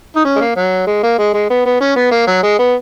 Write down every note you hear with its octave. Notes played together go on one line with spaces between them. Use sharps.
D#4
C#4
G#3
A#3
F#3
G#3
A#3
G#3
G#3
B3
B3
C#4
B3
A#3
F#3
G#3
B3